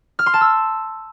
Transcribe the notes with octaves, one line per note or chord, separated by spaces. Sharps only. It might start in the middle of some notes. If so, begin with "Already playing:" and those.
F6
C6
A5
E6